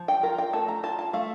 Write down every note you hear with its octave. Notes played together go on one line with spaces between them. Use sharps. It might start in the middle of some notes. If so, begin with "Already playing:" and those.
Already playing: F3
G5
F4 A#4
G5
A3 A5
A#5
F4 A5
A5
A3 F5